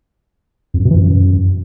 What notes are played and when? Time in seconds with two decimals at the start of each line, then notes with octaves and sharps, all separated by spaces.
0.74 F2
0.79 F#2
0.85 B2
0.91 E3
0.96 F#2